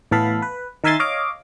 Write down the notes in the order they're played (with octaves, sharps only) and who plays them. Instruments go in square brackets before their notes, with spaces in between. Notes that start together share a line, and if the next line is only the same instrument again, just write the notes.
[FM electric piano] A2 E3 B3 A4 F5 B5
B4
D#3 A#4 E5 G#5 C6 A6
C#5 D#5 F5 D6